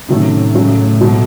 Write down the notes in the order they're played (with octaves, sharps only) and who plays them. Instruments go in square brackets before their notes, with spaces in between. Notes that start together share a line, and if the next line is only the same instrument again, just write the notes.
[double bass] A2 [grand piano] C3 D#3 F#3 A3 C#4
[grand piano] C#3 F#3 A3
B2 F#3 A3